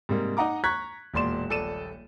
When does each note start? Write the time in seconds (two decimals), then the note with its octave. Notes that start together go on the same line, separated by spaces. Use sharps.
0.09 G#2 C3 G3 A#3
0.37 D#4 D#5 F#5 A#5 D6
0.64 A#5 C#6 F#6 G#6 B6
1.14 E1 A#2 D5 C6 E7
1.49 D#1 A#1 A4 D5 D#7 E7